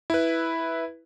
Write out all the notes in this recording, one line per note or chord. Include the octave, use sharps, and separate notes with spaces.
E4 B4